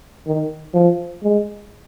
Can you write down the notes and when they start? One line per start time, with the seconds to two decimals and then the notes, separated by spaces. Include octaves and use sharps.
0.27 D#3
0.74 F3
1.23 G#3